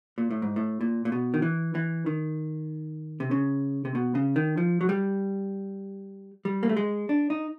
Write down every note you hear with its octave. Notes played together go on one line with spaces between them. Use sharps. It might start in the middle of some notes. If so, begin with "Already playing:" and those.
A#2
A2
G#2
A2
A#2
A#2
B2
D#3
E3
E3
D#3
C3
C#3
C3
B2
C#3
D#3
F3
F#3
G3
G3
A#3
A3
G#3
D4
D#4